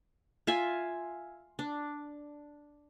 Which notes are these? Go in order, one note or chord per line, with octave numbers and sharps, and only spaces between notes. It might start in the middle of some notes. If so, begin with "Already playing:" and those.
F4 E5 G#5
D4